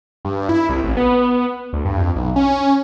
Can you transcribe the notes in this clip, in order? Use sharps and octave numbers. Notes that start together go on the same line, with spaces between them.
G2
E4
C2
A1
B3
D2
G2
F2
B1
C#4